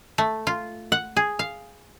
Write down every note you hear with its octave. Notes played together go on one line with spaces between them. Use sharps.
A3
F4
F#5
G#4
F5